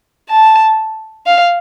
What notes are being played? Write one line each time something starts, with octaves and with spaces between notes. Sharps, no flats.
A5
F5